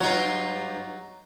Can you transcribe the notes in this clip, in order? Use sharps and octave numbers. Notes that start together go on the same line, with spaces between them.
G2 F#3 D#4 F4 C#5